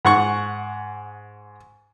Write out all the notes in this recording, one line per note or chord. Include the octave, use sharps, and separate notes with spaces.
G#2 F#5 C#6